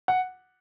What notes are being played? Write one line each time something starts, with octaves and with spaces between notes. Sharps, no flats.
F#5